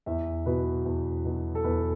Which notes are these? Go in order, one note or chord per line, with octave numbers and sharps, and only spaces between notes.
E2 E5
B2 F#3 B4
E2
B2 F#3
A4
E2 B4